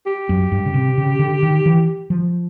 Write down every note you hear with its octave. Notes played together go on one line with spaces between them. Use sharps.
G4
F#2
G2
C#3
C3
C#3
D3
D#3
E3
F3